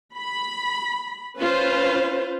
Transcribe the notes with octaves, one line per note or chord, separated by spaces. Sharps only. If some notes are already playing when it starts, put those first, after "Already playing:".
B5
C#4 F4 B4 C5